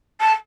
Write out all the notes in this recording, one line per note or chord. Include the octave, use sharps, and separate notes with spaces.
A5